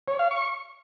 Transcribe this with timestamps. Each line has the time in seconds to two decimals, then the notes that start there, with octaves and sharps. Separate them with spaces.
0.08 C#5
0.19 F5
0.31 C#6